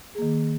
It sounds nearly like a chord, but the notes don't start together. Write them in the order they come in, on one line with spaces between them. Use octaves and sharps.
G#4 A#3 D#3